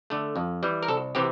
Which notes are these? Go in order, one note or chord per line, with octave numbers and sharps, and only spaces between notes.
D3 A3
F2
E3 G3
A#4
C2 A4
C3 E3 G4